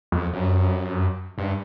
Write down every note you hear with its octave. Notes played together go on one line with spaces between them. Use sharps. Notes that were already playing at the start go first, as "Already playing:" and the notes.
F2
F#2
G2